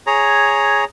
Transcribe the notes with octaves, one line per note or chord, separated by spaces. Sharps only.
G#4 C#5 A#5